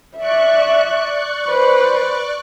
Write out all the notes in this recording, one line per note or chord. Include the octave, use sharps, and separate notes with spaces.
D5 E5 C#6 F#6
B4 C5